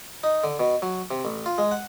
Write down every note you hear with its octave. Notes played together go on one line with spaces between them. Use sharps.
D#4
D3
B2
F#3
C3
A1
F4
G#3
F#5